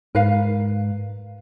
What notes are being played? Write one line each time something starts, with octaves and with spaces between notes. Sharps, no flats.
G#2 A#4 B4 F5